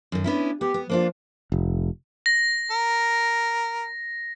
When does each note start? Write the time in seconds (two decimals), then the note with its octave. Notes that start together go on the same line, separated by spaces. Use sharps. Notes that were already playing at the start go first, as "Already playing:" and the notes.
0.12 F#2 D#3
0.24 B3 C#4 D4 E4
0.61 B3 G4
0.74 B3
0.90 F3 A#3 D4 F4
1.52 F1
2.26 A#6
2.71 A#4